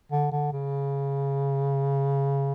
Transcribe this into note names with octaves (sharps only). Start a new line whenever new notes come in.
D3
D3
C#3